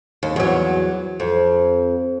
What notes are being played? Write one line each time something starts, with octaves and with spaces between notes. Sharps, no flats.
D#2
E2 F#3
F2